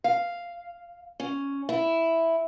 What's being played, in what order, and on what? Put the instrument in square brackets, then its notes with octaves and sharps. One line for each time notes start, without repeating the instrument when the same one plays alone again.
[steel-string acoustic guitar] F5
C#4
E4